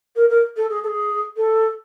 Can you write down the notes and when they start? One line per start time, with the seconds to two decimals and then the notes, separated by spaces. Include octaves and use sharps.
0.15 A#4
0.29 A#4
0.56 A4
0.69 G#4
0.83 A4
0.86 G#4
1.36 A4